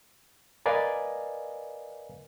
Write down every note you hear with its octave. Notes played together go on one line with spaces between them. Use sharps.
A#4 B4 D5 D#5 F5 G#5